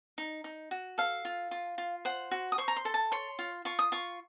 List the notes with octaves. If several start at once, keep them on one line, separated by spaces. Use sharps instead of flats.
D#4
D#4
F#4
A4 F5
F4
F4
F4
C5 F#5
F#4
D#6
C5 C#6
A#5
C6
A4
A5
C#5 C6
F4
F4 C#6
D#6
F4 C#6